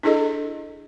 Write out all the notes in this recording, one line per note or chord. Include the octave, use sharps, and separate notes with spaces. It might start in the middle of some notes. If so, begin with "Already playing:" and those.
D4 E4 G#4 A4 D#5